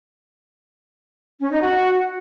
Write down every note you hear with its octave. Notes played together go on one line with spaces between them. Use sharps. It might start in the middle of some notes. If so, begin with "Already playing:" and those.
C#4
D#4
F#4